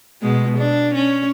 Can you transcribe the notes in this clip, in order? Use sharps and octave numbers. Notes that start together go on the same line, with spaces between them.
B2 G#3
D4
C#4